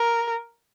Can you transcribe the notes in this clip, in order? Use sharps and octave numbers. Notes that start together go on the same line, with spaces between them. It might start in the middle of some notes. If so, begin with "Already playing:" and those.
Already playing: A#4